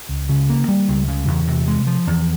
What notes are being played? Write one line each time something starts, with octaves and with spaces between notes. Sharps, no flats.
C#2
C#3
A#3
G3
C#2
C#3
E2
C3
G#3
F3
E2